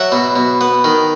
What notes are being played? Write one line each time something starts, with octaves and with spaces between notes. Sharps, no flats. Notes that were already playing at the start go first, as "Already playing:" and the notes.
Already playing: F#3 E5 F#5
B2
B2
B3
D#3